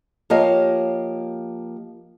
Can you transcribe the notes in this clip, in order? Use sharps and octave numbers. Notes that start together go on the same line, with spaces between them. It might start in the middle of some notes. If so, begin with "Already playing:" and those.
F3 A#3 G4 C#5 D#5 F5